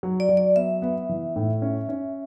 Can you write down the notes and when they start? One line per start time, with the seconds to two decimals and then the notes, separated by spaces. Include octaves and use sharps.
0.03 F#3
0.20 D5
0.29 F#3
0.37 D5
0.56 B3 E5
0.82 B3
1.09 E3
1.36 A2
1.62 C#4
1.89 C#4